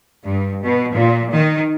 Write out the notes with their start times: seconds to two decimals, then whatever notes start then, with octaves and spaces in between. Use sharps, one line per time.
0.24 G2
0.63 B2
0.94 A#2
1.32 D#3